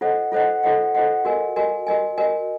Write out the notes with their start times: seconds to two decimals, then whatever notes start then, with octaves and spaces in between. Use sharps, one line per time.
0.01 F4 A4 C5 D#5 F#5
0.32 F4 A4 C5 D#5 F#5
0.63 F4 A4 C5 D#5 F#5
0.95 F4 A4 C5 D#5 F#5
1.25 F#4 A#4 D#5 G#5
1.56 F#4 A#4 D#5 G#5
1.87 F#4 A#4 D#5 G#5
2.18 F#4 A#4 D#5 G#5